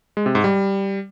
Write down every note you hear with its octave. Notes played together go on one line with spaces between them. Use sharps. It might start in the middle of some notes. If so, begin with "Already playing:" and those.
G#3
C3
G#2
G3